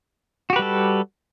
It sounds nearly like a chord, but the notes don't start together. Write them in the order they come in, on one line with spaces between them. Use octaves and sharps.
F#4 G4 B4 G3 A4